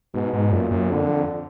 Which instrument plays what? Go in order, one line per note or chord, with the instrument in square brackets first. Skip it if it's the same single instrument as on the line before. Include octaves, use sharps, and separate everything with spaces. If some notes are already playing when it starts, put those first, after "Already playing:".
[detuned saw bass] G#2 [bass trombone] B2
[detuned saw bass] G#2
[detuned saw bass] F#2 [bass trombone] A#2
[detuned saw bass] F#2
[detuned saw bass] F2 [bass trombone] D3